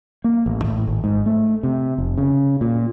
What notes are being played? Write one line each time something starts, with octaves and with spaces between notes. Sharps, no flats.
A#3
A1
A2
G#1
G#2
A3
C3
F1
C#3
A#2